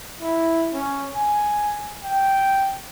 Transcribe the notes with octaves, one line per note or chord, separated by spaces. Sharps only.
E4
C#4
G#5
G5